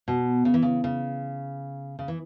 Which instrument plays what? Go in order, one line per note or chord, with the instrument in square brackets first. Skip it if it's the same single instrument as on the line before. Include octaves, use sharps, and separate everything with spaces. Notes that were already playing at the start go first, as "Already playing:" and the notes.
[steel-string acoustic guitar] B2
C#3
E3
C#3
C#3
C#3
E3